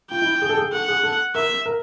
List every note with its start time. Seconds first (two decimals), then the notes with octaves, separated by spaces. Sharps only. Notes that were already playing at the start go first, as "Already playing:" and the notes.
0.11 F4 G5
0.22 E4
0.42 G#4
0.49 A4
0.57 G#4
0.73 A4 F#5
0.88 G#4
1.03 A4
1.35 A#4 E5
1.66 A#4